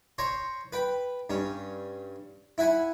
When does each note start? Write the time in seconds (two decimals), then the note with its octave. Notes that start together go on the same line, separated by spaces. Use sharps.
0.18 C5 C#5 A#5 C6 C#6
0.73 B4 G5 B5
1.30 G2 C#4
2.58 E4 E5 F#5 G#5 B5